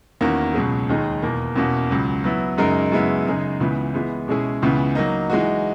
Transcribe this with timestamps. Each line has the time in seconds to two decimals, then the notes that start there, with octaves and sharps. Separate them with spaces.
0.21 E2 D#3 A#3 C#4 F#4
0.54 C#2 B2 F#3 C#4 G#4
0.89 D#2 D#3 G#3 D#4 G#4
1.22 E2 B2 A#3
1.56 E2 B2 A#3 C#4 F#4
1.91 C#2 C#3 F#3
2.24 F#3 B3 E4
2.58 F#2 C#3 G#3 D#4 A#4
2.92 F#2 C#3 G#3 B3 E4
3.26 F#2 C#3 G#3 D#4 G#4
3.60 C#2 C#3 E3 B3
3.94 E3 G#3 B3
4.28 B2 G#3 C#4 E4 G#4
4.62 C#2 C#3 E3 B3
4.95 F#3 A#3 D#4
5.30 E3 G#3 D#4 F#4